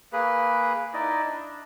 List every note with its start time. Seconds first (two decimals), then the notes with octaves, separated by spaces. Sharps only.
0.13 A#3 G#4 B4
0.94 D#4 E4 D5 D#5
1.25 D4